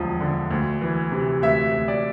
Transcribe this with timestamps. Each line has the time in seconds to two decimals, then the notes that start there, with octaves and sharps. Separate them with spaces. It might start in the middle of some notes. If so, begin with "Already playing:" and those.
Already playing: E1 D2 D3 F3
0.20 D3
0.51 D2
0.82 E3
1.12 C3
1.42 D2 E5
1.73 D2
1.88 D5